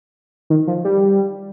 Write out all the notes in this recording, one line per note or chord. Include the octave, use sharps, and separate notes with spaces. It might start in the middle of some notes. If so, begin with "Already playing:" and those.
D#3
F3
G3